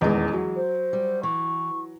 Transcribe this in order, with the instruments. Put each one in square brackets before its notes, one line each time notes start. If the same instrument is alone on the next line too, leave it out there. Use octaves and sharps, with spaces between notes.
[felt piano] D#1 E2 D#4 [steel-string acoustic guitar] E3 G#3
[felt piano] F#3
[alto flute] C5
[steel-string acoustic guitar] G3
[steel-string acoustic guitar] E3 [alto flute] C#6